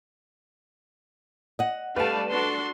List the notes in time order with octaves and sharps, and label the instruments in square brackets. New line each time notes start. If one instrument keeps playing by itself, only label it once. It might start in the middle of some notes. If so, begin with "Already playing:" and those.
[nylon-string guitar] D#5 F#5
[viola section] G3 A3 D4 [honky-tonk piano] B4 A5 [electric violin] D5 F5
[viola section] D4 F#4 A4 [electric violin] C6